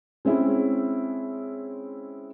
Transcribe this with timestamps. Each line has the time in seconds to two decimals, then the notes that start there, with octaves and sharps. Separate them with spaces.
0.25 G#3 C4 C#4 E4 G#4